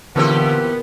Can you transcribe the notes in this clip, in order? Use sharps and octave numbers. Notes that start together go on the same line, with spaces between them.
A#2 D3 E3 B3 C4 G4